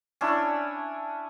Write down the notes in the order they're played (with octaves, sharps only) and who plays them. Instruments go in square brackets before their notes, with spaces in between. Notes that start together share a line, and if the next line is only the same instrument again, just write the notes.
[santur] C#4 D4 E4